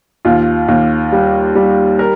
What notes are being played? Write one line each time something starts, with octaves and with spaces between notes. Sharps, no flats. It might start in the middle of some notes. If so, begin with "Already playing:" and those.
D#2 F4
D#2
G3
G3
A#4